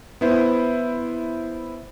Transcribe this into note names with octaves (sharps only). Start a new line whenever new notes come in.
B3 E4 C5